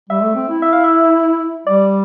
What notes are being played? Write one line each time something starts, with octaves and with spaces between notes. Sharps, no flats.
G3 E5
A3
C4
E4
E5
F5
E5
G3 D5